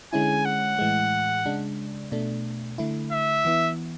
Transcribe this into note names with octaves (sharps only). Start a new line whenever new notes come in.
D3 G#3 C#4 E4 G#5
F#5
A2 E3 G#3
C#3 G#3 D4
B2 A3 D4
D3 A3 E4
E5
E3 B3 E4